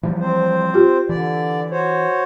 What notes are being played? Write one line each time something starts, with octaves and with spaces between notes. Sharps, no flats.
E3 F3 G3
C4 C5
F4 G4
D3 E3 D5
F#4 C5 C#5